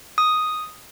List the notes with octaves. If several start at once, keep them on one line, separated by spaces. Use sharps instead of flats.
D#6